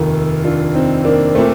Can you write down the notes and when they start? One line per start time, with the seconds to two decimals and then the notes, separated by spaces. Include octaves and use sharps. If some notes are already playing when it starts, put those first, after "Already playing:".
Already playing: F1 D#2 D#3 F4 A4
0.44 D4 F4
0.75 C4 D#4
1.05 A#3 D4
1.35 A#2 A3 C4